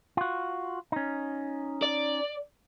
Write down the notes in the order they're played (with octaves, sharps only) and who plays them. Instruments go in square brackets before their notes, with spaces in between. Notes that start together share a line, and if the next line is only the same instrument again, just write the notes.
[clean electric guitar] F4 F#4
C#4 D#4
[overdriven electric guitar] D5